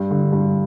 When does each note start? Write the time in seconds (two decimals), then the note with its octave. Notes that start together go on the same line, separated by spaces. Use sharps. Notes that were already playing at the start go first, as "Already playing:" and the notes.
Already playing: G2
0.11 D3
0.32 G2